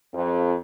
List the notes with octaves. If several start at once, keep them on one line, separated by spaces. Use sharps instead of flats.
F2